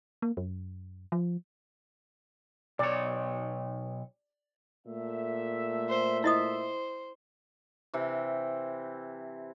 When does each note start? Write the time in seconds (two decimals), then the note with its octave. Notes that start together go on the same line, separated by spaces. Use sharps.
0.22 A#3
0.37 F#2
1.12 F3
2.79 B1 C#5 D5
4.87 A#2 A3 E5
5.89 C5
6.24 E4 C5 D#5 D#6
7.94 C3 E3